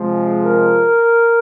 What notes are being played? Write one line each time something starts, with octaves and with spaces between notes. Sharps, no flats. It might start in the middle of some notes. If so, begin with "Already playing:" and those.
Already playing: C3 F3 G#3
A#4